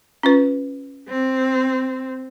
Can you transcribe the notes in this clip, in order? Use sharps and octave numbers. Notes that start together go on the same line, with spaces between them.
C#4 F4 B4
C4